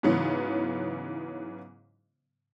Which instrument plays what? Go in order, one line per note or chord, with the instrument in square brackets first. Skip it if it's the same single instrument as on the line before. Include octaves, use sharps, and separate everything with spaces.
[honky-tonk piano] G#2 C#3 E3 F#3 B3